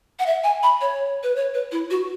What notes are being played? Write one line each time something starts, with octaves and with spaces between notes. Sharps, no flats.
F#5
E5
G#5
B5
C#5
B4
C#5
B4
E4
F#4